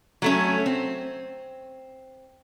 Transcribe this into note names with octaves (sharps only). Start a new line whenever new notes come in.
F#3 A3 C#4
C4